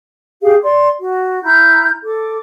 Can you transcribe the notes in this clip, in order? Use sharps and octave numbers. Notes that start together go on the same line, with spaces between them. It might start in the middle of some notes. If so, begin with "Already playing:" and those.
G4 G#4 F5
D5 C6
F#4
E4 A#5 F6 G6
A4 D6